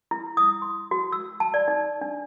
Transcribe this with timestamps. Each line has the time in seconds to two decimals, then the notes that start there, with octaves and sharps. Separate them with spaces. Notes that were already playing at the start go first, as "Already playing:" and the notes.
0.11 E4
0.37 D#6
0.62 C6
0.91 F#4
1.12 E6
1.40 A5
1.54 D5
1.68 D#4
2.01 D4